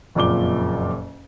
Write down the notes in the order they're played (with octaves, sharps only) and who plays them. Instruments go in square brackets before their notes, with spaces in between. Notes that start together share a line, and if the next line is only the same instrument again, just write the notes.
[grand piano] F#1 F2 A#2 D6 G7